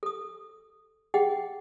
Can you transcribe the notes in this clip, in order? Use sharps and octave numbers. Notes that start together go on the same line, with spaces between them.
A4 D#6
G#4 D#5 F#5 G5